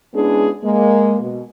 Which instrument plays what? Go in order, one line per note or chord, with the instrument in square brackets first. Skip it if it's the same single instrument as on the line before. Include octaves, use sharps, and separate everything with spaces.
[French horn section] G#3 B3 C#4 D4 E4 G#4
G#3 A#3
B2